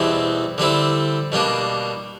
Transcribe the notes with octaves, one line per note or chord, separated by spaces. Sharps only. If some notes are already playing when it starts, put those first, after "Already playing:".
Already playing: E2 B2 G3 C4 E4
D3 G3 C4 E4
B2 G3 A#3 D4